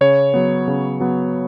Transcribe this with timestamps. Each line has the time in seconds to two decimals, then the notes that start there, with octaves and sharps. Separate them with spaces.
0.01 C#3 C#5
0.34 F#3 B3
0.68 C#3
1.00 F#3 B3